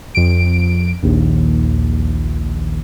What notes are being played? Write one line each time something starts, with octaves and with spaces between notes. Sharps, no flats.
F2 D7
A#1 D#2